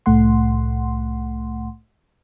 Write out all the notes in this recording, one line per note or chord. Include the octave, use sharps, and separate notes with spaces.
C2 A2 A3 F#5 C6